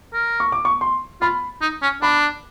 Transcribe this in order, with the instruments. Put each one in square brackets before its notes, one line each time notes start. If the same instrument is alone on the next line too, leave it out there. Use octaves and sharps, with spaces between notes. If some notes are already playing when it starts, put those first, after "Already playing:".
[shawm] A#4
[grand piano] C#6
D6
C#6
C6
[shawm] F4 [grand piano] B5
[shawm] D#4
C#4
[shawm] D4 [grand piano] B5